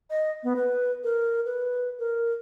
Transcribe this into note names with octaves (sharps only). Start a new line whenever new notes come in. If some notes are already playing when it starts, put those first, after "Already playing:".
D#5
B3
B4
A#4
B4
A#4